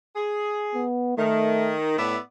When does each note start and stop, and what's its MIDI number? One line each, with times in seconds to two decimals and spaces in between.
0.16 0.82 68
0.75 1.15 59
1.18 1.94 51
1.18 1.76 57
1.98 2.16 45
1.98 2.16 59
1.98 2.16 74
1.98 2.16 76